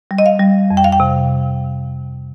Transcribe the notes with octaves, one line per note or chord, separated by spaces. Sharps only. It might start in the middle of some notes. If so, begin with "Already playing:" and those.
G3
D#5
F5
G3
F2
G5
F5
G5
C3